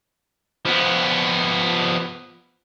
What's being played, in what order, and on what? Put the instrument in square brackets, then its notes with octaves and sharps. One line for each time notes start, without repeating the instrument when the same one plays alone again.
[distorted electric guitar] F3 B3